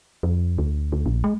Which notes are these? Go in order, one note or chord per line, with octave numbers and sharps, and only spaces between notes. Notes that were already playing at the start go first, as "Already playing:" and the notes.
F2
D2
D2
A#1
G#3